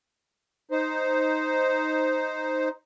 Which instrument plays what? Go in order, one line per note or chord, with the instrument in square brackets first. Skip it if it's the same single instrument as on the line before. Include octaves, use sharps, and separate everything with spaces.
[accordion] D#4 C5